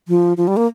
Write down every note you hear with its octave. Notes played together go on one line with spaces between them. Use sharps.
F3
F3
G3
A#3